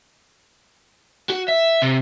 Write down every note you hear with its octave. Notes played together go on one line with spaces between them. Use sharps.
F#4
E5
C3